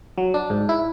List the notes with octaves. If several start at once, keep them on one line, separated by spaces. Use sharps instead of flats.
F#3
D4
G#2
E4